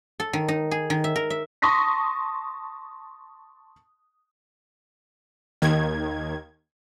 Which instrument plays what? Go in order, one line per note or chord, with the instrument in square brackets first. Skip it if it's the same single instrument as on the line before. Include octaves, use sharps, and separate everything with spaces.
[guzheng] A4
D#3
D#4
G#4
D#3
E5
A#4
E5
[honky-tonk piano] A5 C6 C#6 D#6 A#6 B6
[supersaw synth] D#2 D#3 G#6